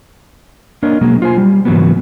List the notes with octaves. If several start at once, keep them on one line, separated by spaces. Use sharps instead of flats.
A#3 D4 A#4 C#5 D#5
B2 F#3 G#3 A#3
F4 C5 G#5
G3
G#2 C#3 E3 F#3 A#3 B3